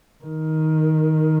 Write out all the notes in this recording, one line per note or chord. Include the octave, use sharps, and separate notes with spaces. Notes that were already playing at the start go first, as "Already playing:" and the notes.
D#3